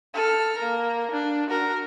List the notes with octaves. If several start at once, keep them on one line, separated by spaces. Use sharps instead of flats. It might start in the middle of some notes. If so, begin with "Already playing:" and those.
A4 F6
A#3 A#4
D4
F#4 A#4